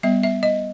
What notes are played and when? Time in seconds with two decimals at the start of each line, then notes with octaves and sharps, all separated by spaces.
0.03 G3 B3 E5
0.23 E5
0.43 D#5